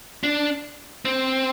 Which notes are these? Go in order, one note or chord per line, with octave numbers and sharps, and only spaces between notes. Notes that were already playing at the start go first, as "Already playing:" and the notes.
D4
C4